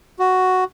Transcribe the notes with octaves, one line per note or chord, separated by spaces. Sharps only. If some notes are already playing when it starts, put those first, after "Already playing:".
F#4